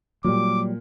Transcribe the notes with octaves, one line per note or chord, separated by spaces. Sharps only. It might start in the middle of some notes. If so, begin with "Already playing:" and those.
A#2 F#3 G3 D6